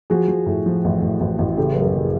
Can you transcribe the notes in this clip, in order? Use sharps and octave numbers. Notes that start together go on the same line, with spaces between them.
F3 F#4 G#4
F3
A2
F3
A1
A1
A1
A1
C#3 G4 A4
F#2 B4
G#4 A#4
F#1